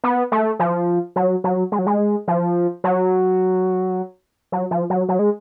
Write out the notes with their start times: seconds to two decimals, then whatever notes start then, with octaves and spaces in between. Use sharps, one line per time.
0.04 B3
0.32 A3
0.59 F3
1.16 F#3
1.44 F#3
1.72 G#3
1.79 F#3
1.87 G#3
2.28 F3
2.84 F#3
4.52 F#3
4.71 F3
4.90 F#3
5.09 F#3
5.19 G#3